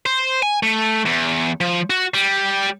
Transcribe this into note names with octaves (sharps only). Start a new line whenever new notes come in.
C5
G#5
A3
E2
F3
F#4
G3